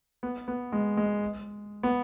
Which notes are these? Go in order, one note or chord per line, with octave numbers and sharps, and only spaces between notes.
B3
B3
G#3
G#3
B3